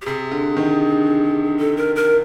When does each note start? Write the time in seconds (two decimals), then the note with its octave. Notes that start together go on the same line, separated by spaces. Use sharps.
0.02 G4
0.06 C3 G#4
0.32 D3
0.56 D#3
1.58 A4
1.77 A#4
1.96 A#4